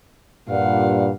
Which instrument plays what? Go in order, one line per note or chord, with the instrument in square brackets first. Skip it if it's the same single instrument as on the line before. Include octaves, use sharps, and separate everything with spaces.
[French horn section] G2 A#2 [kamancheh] F5 F#5